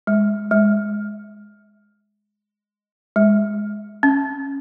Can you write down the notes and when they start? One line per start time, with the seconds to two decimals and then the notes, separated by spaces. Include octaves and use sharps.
0.07 G#3
0.51 G#3
3.16 G#3
4.03 C#4